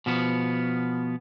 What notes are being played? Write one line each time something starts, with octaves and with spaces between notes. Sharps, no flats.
B2 F3 B3